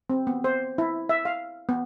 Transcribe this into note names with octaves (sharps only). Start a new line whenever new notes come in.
C4
B3
C5
E4
E5
F5
B3